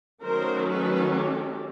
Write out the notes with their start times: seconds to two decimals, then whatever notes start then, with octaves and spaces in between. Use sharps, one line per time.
0.23 D#3 F#3 A3 C#4 A#4 C5
0.68 A4 B4
1.14 G4 A4